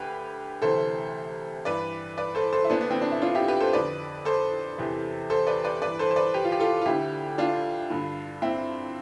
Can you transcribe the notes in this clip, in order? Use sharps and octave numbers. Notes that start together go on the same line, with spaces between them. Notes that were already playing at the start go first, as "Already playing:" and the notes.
Already playing: D2 D3 G4 B4
D2 C3 E3 A4 C5
G2 E3 B4 D5
B4 D5
A4 C5
A4 C5
E4
D2 D3 B3 D4
B3
C4
D4
E4
D4 F4
E4 G4
G4 B4
A4 C5
F2 D3 B4 D5
A4 C5
E2 C3 E3
A4 C5
B4 D5
B4 D5
G2 E3 B4 D5
A4 C5
C5
B4 D5
G4 B4
F4
G4
F4 A4
F4
D2 D3 E4 G4
D4 F4
G2 D3
C4 E4